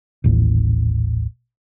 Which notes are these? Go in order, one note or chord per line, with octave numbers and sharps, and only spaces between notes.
D#1 A1